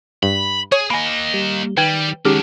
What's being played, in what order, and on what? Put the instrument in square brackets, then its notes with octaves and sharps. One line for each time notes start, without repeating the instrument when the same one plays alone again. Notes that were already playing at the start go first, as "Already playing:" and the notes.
[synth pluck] G2 [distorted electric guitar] B5
[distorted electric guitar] G#4 [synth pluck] C#5
[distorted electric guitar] A#3 D#5 [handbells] G#5 B5
[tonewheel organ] G3
[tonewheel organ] D#3 [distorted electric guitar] G3 [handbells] B4 G5 G#6
[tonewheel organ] D#3 G#3 [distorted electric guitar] F#3 D4 [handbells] C#4 G4 F6